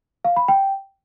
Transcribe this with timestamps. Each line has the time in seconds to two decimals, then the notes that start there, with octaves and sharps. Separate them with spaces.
0.25 F5
0.36 B5
0.48 G5